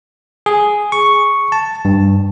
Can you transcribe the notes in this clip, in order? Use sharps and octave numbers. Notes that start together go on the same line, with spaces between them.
G#4
C#6
A5
G2